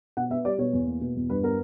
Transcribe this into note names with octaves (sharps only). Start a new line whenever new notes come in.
B2 F#5
B3 E5
G3 D5
B2 C#5
E2
A#3
B2
E2
G2 B4
B3 A#4